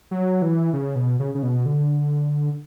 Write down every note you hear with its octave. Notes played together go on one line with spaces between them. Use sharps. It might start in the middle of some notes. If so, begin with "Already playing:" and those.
F#3
E3
C#3
B2
C#3
C#3
B2
D3